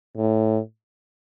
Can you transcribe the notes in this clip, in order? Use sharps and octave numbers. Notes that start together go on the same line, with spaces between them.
A2